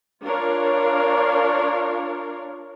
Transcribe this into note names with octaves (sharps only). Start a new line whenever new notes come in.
D4 F4 A#4 C#5 F5